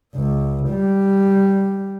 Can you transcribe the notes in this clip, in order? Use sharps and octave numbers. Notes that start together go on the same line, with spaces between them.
C#2
G3